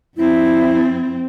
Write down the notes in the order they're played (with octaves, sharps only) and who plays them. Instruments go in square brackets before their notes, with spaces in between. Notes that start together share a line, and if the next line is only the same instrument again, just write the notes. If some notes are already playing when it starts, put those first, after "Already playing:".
[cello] F2 C4 [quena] E4